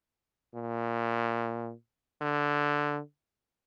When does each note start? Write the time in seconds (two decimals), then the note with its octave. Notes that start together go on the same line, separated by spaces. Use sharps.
0.55 A#2
2.21 D3